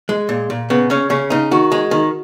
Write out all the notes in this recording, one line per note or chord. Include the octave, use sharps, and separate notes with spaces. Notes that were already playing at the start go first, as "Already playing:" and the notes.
G#3
A#2
A#2
C#3 B3
C#3 C#4
C#3 C#4
C#3 D#4
D#3 F#4
G#3
D#3